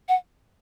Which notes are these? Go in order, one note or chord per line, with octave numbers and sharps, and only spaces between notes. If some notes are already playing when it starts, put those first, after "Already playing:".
F#5